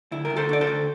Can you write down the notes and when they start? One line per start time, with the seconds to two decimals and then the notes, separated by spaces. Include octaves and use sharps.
0.12 D2 E4
0.25 A#4
0.30 D2
0.36 A4 C5
0.49 D3 D5
0.61 A4 C5
0.67 D2